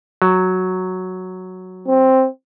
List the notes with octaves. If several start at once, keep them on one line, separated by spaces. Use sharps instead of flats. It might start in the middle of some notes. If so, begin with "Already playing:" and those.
F#3
C4